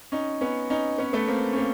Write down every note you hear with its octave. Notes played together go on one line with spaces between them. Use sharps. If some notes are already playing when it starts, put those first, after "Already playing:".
C#4 D#4
B3 C#4
C#4 D#4
B3 C#4
A3 B3
A#3 C4
C#4
A#3 C4